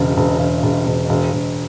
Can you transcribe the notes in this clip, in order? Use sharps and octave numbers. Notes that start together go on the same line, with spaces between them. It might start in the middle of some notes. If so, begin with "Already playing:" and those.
Already playing: E1 C#3
E1
E1
E1
E1
E1
E1